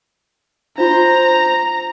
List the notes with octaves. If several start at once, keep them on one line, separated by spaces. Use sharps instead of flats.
D4 F4 C5 A#5